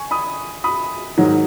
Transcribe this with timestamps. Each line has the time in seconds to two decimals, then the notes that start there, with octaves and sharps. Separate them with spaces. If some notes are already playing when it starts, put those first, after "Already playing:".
Already playing: G#5 C#6
0.11 B5 D#6
0.64 B5 D#6
1.18 G#2 D#3 F#3